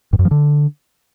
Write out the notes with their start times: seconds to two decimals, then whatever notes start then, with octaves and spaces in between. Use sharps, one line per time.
0.13 G2
0.19 F#2
0.25 F3
0.31 D3